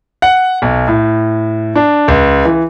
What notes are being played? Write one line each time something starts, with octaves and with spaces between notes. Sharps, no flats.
F#5
B1
A2
D4
C#2
E3